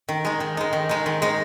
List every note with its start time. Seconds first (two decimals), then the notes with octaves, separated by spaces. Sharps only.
0.09 D#3
0.25 G#3 D#4
0.40 D#3
0.57 G#3 D#4
0.73 D#3
0.89 G#3 D#4
1.06 D#3
1.22 G#3 D#4